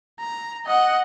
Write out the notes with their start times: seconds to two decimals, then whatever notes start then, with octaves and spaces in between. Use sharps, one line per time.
0.20 A#5
0.67 D#5 F#5